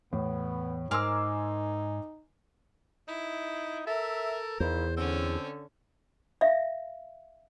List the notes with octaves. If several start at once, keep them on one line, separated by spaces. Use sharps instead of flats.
E2 A2 B3
G#2 D#4 A#4 G#5 C6 D6 E6 F6
D#4 E4
A4 A#4 E5
E2 D#3 F3 E4 C5
D3 C4 C#4 A4
E5 F5